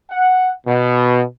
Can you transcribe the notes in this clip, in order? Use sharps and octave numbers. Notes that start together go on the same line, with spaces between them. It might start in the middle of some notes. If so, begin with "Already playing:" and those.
F#5
B2